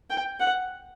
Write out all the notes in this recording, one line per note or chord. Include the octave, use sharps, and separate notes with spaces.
G5
F#5